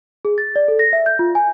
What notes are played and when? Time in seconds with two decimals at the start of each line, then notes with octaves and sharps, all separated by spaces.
0.25 G#4
0.38 A6
0.56 D5
0.68 A4
0.79 A#6
0.93 E5
1.06 G6
1.19 F4
1.35 G#5